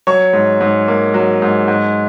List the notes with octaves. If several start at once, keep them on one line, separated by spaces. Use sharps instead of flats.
F#3 C#5 C#6
G#2
G#2
A#3
F#3
G#2
G#2